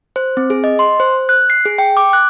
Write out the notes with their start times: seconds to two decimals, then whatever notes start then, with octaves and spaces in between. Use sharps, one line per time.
0.16 C5
0.37 C4
0.50 G#4
0.64 D#5
0.79 C6
1.00 C5
1.29 F#6
1.50 C7
1.66 G#4
1.78 G5
1.97 D6
2.13 F#6